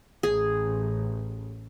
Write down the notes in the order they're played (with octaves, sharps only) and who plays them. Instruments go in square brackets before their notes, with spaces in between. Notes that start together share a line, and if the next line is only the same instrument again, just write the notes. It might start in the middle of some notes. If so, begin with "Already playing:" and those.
[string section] A1 [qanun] G#4